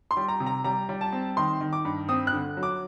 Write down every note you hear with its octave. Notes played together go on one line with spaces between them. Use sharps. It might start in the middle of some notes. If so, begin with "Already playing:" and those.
C6
G3
A#5
C3
A#5
G3 A#5
G3
A5
C4
D#3 C6
D#3
D6
G2
C4 D#6
F#6
D3
F#3
D6